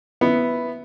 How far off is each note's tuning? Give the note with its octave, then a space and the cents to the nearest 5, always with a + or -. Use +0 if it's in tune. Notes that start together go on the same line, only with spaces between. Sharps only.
B3 +0 E4 +0